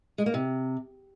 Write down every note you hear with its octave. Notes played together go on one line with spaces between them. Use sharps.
G#3
A#3
C3